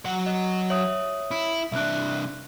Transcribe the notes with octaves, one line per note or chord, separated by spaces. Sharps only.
F#3 F#5
D#5
C#5 E5 D#6
E4
C2 D4 E5 F#6